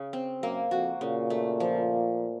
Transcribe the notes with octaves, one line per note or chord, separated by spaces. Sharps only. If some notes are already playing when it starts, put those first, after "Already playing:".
Already playing: C#3
C4
F#2 A#3
F2 F#4
A#2 C#3
A3
F3